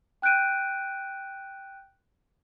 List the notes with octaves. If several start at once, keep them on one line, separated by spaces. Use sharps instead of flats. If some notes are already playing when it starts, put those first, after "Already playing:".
G5 F#6 G6 D7 D#7